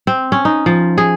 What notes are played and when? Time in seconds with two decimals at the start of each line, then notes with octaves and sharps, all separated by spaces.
0.07 C4
0.32 C#4
0.45 D#4
0.66 F3
0.98 G#4